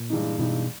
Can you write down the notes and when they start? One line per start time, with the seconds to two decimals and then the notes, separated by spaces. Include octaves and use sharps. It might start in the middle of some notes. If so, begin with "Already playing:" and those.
Already playing: A#2
0.10 G2 E3 G#3 D#4
0.39 G2 B2 E3 G#3 D#4